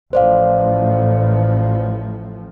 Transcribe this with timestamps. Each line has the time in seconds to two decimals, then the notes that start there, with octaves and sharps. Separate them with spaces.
0.13 A1 A2 F3 C5 D5 F5